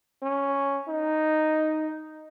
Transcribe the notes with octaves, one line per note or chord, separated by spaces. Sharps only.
C#4
D#4